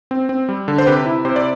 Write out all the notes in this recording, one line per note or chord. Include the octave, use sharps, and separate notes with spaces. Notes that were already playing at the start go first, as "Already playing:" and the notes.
C4
C4
G3
D3
C5
C3 G4 B4
E4
C3 C5
D5